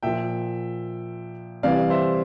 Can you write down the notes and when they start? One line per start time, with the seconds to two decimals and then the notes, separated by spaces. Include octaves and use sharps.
0.03 A#2 F3 E5 G5
1.63 C3 E3 G3 D5 F5
1.90 C5 E5